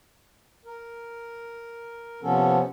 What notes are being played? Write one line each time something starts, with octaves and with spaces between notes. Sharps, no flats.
A#4
C3 F3 B3 C#4 A4